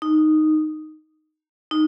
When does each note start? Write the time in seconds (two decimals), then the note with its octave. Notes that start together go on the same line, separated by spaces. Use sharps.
0.02 D#4
1.71 D#4